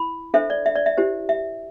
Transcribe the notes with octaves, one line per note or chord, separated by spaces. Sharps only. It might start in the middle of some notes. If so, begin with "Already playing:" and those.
Already playing: E4 B5
D4 A4 C5 E5
D5
E5
D5
E5
E4 G4 C5
E5